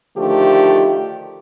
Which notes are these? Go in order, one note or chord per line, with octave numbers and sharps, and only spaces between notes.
D3 D#3 F3 A3 G4